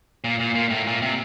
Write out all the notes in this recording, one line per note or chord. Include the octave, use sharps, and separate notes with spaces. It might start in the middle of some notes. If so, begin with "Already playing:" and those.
A#2
A#2
A#2
A2
A#2
C3